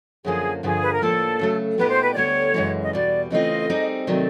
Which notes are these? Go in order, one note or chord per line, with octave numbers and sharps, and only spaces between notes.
F#2 D3 F3 A#3 G#4
G2 D3 F3 A#3 G#4
B4
A#4
A2 F3 A#3 D4 A4
C#3 F#3 A3
A#2 G3 B3 D#4 G4 B4
C5
B4
D5
D2 D3 G3 B3 C#5
F#2 C#3 E3 G#3
D#5
E2 B2 G3 D5
C#3 E3 A3 C4 F4 D#5
G3 C4 D#4 G#4
C3 D#3 F#3 A3 D5